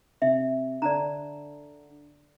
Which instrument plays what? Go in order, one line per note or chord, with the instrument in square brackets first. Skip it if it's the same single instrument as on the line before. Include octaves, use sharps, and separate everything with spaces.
[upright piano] C3 [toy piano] E5
[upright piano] D3 [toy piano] D5 A5 A#5